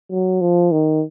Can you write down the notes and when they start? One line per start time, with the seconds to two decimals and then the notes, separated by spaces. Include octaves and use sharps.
0.10 F#3
0.41 F3
0.72 D#3